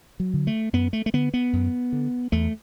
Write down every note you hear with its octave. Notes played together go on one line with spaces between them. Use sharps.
F#3
D3
A3
F#2 B3
A3
A3
D3 B3
B3
F#2
D3
E2 A3